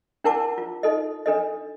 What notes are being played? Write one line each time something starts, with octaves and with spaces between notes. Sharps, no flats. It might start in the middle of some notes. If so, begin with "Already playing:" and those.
D4 E4 A#4 F#5 A5 D6
F4
D#4 A4 D#5
D4 A4 D#5